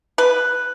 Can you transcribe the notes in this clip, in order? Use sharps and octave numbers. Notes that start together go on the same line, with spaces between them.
B4